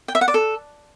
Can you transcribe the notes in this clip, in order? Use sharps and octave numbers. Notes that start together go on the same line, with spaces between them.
G5
E5
F#5
D5
A4